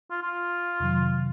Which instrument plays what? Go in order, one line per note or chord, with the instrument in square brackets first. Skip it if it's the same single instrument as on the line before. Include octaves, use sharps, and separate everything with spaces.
[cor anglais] F4
F4
[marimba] F2 C3 D#3 F#3